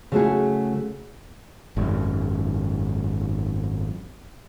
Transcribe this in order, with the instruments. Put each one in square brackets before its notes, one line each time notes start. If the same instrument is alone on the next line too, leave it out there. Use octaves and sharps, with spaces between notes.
[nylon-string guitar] C#3 F#3 A3 E4 F#4 G#4
[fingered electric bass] G#1 F#2